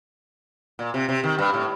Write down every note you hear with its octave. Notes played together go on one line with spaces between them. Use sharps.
A#2
C3
C3
D#3
G2
A2